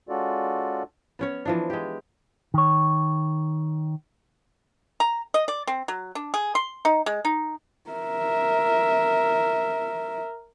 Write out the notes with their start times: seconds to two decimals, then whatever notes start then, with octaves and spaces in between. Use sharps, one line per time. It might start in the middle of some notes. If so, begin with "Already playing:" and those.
0.09 G#3 C#4 F4 F#4 A4 D5
1.19 B3 C#4 C#5
1.45 E3 F3 D4
1.70 G#3 G4
2.54 D#3 C#5
5.00 A#5
5.34 D#5
5.48 D5
5.67 C4
5.88 F#3
6.15 D4
6.34 G#4
6.55 C6
6.85 D#4
7.06 G#3
7.25 D#4
7.90 A#4 E5